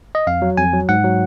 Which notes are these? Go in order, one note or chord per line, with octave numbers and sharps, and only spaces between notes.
D#5
F2 F5
F#3
F2 G#5
F#3
G#2 F#5
F#3